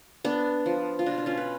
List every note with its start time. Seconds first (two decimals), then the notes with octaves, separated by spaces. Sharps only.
0.25 B3 D4
0.66 F3
0.99 F4
1.06 B2 D4
1.18 D4
1.26 C#4 F4
1.37 B4